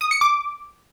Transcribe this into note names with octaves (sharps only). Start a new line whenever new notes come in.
D#6
C#7
D6